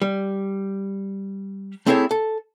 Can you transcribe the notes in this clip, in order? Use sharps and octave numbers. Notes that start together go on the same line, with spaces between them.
G3
A3 C4 E4 G#4 A4 C#5
A4